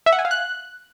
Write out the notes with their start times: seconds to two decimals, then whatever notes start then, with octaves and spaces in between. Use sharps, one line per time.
0.06 E5
0.13 F#5
0.19 G#5
0.25 F5
0.31 F#6